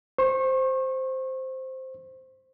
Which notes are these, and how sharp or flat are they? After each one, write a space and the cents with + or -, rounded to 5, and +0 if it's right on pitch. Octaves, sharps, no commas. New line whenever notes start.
C5 +0 C#6 -35